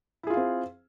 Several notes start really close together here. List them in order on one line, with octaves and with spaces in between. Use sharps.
E4 G#4 F4 F5 C4